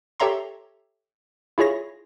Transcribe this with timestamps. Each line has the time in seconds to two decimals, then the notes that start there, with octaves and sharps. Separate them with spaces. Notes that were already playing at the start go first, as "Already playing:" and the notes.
0.20 G4 A4 C#5 E5 A#5 C6
1.58 E4 F4 G#4 C#5 A#6